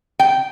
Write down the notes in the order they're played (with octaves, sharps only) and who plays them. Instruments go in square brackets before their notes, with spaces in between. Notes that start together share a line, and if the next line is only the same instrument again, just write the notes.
[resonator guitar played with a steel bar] G5